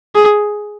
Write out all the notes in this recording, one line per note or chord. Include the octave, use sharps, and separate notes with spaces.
G#4